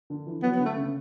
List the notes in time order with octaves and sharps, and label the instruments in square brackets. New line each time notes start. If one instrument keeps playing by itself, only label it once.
[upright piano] D3
E3
[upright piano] F#3 [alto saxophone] B3
[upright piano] D3 [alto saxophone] B3
[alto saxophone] A3
[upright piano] C#3